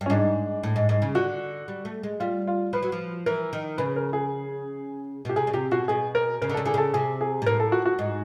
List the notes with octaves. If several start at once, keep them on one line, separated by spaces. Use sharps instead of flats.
G2
C#4
G#2 D4
A2
G#2
G#2
C#3
D3 F#4
G3
A3
G#3
G3 F4
F4
F3 B4
F#3
F3
E3 A#4
D#3
C#3 B4
A#4
G#4
B2 G4
C3 G#4
C#3
C3 G4
B2 F#4
B2 G#4
A#4
C#3 A#4
D3
C#3 A4
D3 G#4
C#3 A4
C3 G#4
G#4
A#2
A2 A#4
A4
F#4
F#4
G#2